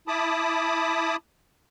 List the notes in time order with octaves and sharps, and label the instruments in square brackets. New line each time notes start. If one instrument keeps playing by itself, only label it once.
[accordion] E4 A5 B5 D6 D#6